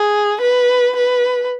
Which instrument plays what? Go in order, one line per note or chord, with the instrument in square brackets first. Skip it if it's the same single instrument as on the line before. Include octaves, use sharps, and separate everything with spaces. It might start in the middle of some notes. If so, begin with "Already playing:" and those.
Already playing: [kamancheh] G#4
B4
B4